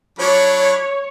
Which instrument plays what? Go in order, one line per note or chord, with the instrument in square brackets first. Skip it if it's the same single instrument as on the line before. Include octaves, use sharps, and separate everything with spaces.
[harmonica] F#3 D4 B5 [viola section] C#5